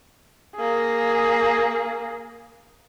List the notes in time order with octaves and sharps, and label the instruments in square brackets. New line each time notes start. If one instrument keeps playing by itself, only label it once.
[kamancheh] A#3 G#4